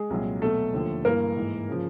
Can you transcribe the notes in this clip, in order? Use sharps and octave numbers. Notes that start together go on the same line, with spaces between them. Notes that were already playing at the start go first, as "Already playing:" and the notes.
Already playing: G#3 G#4
C2 A#2 F#3
E2 B2 F#3 A3 A4
D#2 D3 F3
G2 E3 A#3 A#4
G#2 E3
C#3 F3